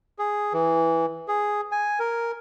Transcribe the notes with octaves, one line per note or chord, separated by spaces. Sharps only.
G#4
E3
G#4
G#5
A#4